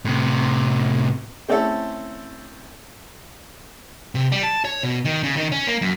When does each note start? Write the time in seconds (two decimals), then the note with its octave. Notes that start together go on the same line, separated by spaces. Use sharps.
0.05 A2 C3
1.49 A3 C4 C#4 E4 A4
4.15 C3
4.32 G3
4.43 A5
4.65 C#5
4.83 B2
5.05 D#3
5.23 C#3
5.37 D#3
5.52 C#4
5.67 A#3
5.82 F#2